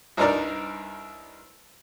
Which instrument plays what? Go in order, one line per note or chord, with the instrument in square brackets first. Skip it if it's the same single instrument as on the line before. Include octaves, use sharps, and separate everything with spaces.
[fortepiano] C2 G2 D4 D#4 A#4 D5